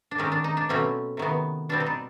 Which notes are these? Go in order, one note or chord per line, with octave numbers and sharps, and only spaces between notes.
D4
D#3 G#3 C4 C#4
D4
D#4
D4
B2 F#3 A3 C4 C#4
C3 D#3 F#3 B3
B2 G3 C4 D4
D#4
D4